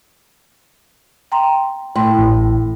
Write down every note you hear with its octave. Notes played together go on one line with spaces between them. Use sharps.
G5 A#5 C6
A2 G5 C6
A1